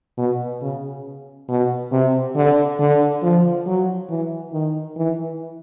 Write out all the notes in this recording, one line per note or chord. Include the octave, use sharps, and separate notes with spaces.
B2
C#3
B2
C3
D3
D3
F3
F#3
E3
D#3
E3